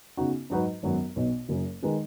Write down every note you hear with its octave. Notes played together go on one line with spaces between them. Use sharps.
C#3 B3 D#4 F#4
G#2 F#3 D#4 F#4 B4
G#1 F#2 F#3 B3 F#4
B1 B2 B3
F#1 F#2 F#3
D#3 G#3 D#4 B4